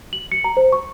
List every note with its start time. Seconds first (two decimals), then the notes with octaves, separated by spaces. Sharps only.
0.13 F#7
0.32 C#7
0.44 A#5
0.57 C5
0.72 C#6